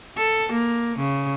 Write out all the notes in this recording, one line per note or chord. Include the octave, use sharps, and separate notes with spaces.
A4
A#3
C#3